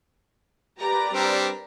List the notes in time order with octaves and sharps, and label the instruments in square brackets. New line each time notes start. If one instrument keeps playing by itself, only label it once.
[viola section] G4 B4 D5 [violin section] A#4 A#5
[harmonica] G3 C4 D4